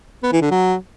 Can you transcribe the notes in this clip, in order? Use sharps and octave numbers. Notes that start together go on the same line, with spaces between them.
B3
E3
D3
F#3